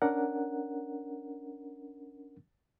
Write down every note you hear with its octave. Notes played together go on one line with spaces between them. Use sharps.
C#4 D4 A#4 F#5